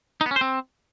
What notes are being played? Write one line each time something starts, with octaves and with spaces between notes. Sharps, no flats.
D#4
B3
C#4
C5
C4